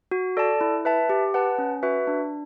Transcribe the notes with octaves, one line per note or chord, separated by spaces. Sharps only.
F#4
A4 D5 A5
E4
B4 E5 A5
G4
B4 F#5 A5
C#4
F#4 B4 E5
D4